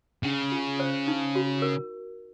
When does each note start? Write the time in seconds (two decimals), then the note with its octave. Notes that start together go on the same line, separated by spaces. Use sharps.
0.23 C#3 C#4
0.52 F4
0.80 C5
1.08 D#4
1.35 F#4
1.62 A#4